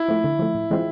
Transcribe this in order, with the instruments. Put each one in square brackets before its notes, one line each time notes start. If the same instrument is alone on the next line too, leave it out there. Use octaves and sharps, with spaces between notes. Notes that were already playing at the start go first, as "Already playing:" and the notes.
Already playing: [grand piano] E4
[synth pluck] F3 A3
D3
F3 A3
A2
E3 G#3 C4 F4